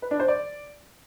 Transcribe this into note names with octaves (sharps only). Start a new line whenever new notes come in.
B4
D4
C5
D5